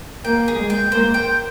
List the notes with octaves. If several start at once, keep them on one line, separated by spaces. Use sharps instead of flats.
A#3 G5
G#4
G#3
G5
A#3 C5
G5